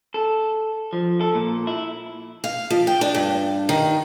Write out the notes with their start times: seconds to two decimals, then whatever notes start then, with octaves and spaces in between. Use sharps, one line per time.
0.14 A4
0.93 F3
1.21 A4
1.35 A#2
1.67 E4
2.44 F5
2.70 F3
2.87 G5
3.01 D4
3.15 G2
3.69 D#3